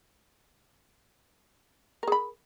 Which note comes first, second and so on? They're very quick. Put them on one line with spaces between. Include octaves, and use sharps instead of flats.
A#4 G#4 B5